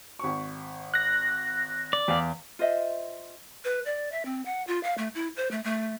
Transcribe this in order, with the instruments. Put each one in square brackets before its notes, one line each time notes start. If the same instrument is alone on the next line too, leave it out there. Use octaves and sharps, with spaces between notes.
[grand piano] G#1 C#6
[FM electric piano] F#6 A#6
[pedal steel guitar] D5
[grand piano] E2 F5
[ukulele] F4 C5 D#5 E5
[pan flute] B4
D5
E5
C4
F#5
F4
F5
A3
E4
C5
A3
A3